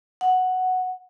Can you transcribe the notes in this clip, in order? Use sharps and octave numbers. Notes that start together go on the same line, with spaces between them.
F#5